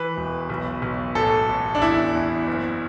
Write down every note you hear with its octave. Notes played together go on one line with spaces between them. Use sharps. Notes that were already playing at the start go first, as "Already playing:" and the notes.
Already playing: E3 B4
E1
B1
B1
A1 A4
A1
D4
E2 E4
E2
F#1